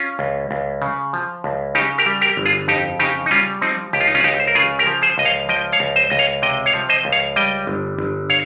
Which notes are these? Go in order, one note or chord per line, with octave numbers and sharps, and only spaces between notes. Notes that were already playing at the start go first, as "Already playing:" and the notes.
Already playing: C#4 F4
C#2
C#2
C#3
F3
C#2
C#3 D#4 G4
G4 A#4
G3
G4 A#4
G1
F4 G#4
F2 D#4 G4
C#3 D#4 G4
D#4
G3 C#4 F4
F3 C4 D#4
C#2 G4
F4
D#4
C#4 F4
G#4
C#2 D#4 G4
C5
A#4
C#3 F4 G#4
G4 A#4
F3
G#4 C5
C#2 D#5
C#5 F5
F3 D#5 G5
C#5 F5
C#2
C5 D#5
C#2 D#5
C#5 F5
C3 D#5 G5
C#5 F5
F3
C5 D#5
C#2
C#5 F5
G3 D#5 G5
G1
G1
C#5 F5